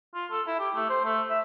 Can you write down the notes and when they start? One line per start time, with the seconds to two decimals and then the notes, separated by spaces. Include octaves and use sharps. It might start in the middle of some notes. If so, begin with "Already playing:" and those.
0.15 F4
0.31 A4
0.47 E4
0.59 G4
0.75 A3
0.89 C5
1.05 A3
1.30 E5